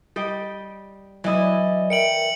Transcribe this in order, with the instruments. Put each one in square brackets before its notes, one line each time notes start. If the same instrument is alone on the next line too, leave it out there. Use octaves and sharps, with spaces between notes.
[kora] G3 D#5 G5
[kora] E3 E4 [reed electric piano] F#3 [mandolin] D5 D#5
[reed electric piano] A#4 E5 G5 [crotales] C#7 D7 F#7